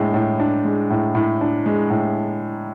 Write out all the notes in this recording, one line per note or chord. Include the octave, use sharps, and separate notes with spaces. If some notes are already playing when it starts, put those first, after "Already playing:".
Already playing: A2 G#3 D4
A2
D4
G#3
A2
A2
D4
G#3
A2